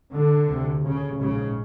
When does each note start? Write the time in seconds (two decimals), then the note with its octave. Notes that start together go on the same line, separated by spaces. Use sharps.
0.13 D3
0.48 D2 C3
0.83 C#3
1.18 A#1 G#2 C#3